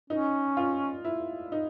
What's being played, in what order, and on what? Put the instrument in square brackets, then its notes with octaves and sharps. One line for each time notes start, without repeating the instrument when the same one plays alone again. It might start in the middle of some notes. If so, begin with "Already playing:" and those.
[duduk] C#4 [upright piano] D#4
[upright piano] F4
E4
D#4